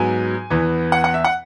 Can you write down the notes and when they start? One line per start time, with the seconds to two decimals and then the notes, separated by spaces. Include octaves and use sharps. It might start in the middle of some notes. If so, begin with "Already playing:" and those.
Already playing: G#2 F#3 B3 G#5
0.50 E2 E3 B3
0.92 F#5
1.04 F#5
1.14 E5
1.24 F#5